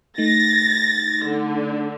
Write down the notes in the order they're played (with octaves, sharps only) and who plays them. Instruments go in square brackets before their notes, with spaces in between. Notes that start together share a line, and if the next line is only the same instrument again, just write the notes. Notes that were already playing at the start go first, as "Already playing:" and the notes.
[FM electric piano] A3 D#4 [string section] A6 A#6
[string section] D3